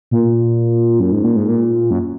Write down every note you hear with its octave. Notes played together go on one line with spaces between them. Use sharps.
A#2
F#2
G#2
A#2
G#2
A#2
F#2